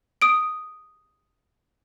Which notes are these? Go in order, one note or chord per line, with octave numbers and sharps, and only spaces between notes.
D#6 D7